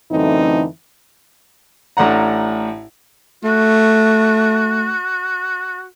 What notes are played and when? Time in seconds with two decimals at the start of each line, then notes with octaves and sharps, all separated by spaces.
0.11 F#2 D3 E3 A3 C4 D#4
1.97 A1 A2 D4 F#5 A#5
3.44 A3 F#4